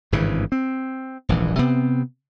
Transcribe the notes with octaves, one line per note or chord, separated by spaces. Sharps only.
G#1 G2 C#3 E3
C4
D#1 A#1 G#2 E3
C3 B3 C4